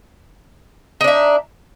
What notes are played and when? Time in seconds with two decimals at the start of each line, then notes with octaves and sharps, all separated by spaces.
1.01 D#4
1.04 D4
1.08 E5